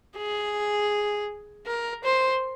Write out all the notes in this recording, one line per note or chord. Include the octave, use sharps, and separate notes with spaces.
G#4
A#4
C5